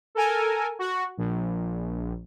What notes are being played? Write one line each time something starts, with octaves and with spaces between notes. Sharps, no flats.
A4 A#4 G#5
F#4
A#1